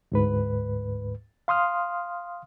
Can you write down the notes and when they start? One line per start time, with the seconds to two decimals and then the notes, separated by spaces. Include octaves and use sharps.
0.12 D2 G#2 B4
1.48 F5 C6 D#6 F6